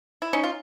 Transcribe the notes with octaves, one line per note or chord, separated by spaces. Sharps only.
E4
C#4 D#4
F4